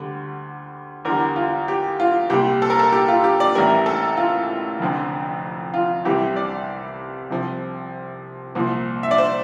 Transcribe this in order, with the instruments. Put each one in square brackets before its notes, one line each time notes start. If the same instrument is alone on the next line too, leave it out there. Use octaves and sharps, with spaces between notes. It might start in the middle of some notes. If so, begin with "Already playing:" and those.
Already playing: [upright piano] D2 D3 G3
E2 D3 G3 A#4
F4
G4
F4
C2 A#2 G3 G4
A4
A#4
A4
G4
F4
G4
D5
A1 A2 E3 G3 A#4
A4
F4
F1 F2 D3 F3
F4
C2 C3 E3 G3 G4
D5
C2 C3 F3
C2 A#2 F3
E5
D5
C5